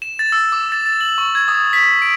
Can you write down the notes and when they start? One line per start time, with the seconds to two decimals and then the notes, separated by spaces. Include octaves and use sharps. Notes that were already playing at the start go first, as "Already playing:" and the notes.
0.02 E7
0.19 A6
0.32 E6
0.52 D6
0.72 A6
0.86 A6
1.01 F#7
1.18 C#6
1.35 G#6
1.48 D#6
1.73 B6
2.02 D7